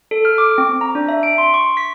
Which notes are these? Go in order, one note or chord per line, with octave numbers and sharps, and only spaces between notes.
A4
F6
D6
C4
A#5
D4
E5
D7
C6
C#6
B6